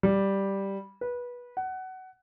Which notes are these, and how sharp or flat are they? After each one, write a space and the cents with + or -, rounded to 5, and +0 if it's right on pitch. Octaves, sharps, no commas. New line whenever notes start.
G3 +0
B4 -20
F#5 +20